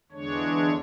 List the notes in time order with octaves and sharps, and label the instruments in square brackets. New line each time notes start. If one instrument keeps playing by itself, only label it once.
[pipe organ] E2 D3 G#3 D4 C#5